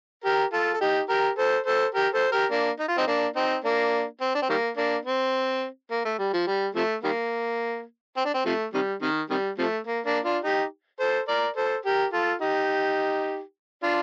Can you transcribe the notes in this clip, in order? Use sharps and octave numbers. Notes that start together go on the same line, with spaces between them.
G4 A#4
F4 A4
A4
D#4 G4
G4 A#4
A4 C5
A4 C5
G4 A#4
A4 C5
G4 A#4
A#3 D4
D#4
F4
C4 D#4
A#3 D4
C4 D#4
A#3 D4
C4
D4
C4
D#3 G3 A#3
A#3 D4
C4
A#3
A3
G3
F3
G3
C3 F3 A3
D#3 G3 A#3
C4
D4
C4
C3 F3 A3
C3 D#3 G3
C3 D#3
C3 D#3 G3
C3 F3 A3
A#3
A#3 D4
D4 F4
D#4 G4
A4 C5
A#4 D5
A4 C5
G4 A#4
F4 A4
D#4 G4
D4 F4